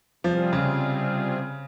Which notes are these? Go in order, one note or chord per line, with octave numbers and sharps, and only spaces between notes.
C3 F3 G3 C4 F4 G#4
C#3